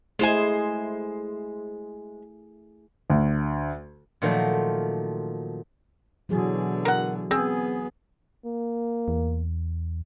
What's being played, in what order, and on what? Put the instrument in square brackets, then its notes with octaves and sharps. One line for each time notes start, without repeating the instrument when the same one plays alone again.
[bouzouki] G#3 C5 G#5 [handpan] A3 E4 G#4
[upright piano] D2
[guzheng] A#2 D#3 F3 F#3 A3
[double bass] B2 D3 [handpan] E3 F#3 G#4
[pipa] A#4 F#5
[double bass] B3 [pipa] C4 [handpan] G#4
[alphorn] A#3
[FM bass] E2